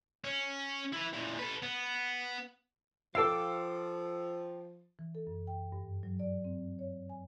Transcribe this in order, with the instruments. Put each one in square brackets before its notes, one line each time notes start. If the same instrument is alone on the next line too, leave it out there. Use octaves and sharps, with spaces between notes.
[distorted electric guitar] C#4
E4 B4
A#2 E3
A4 B4
B3
[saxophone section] F3 [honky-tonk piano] A4 E6 [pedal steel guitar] F5 G5 D6
[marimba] E3
A4
F#2
G5
G2
F#3
D5
C4
C#5
G#5